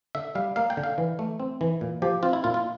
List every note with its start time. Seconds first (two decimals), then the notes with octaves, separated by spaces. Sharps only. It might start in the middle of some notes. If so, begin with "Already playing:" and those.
0.15 D3 E5
0.35 G3 F5
0.56 A#3 F5
0.70 G5
0.77 D3
0.84 F5
0.98 E3
1.19 A3
1.40 C4
1.61 E3
1.81 A#2
2.02 F3 G4
2.23 C4 F4
2.33 E4
2.44 A#2 F4
2.54 F4